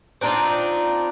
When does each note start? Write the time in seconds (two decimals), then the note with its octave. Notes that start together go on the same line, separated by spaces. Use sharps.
0.21 C4 D4 D#4 F4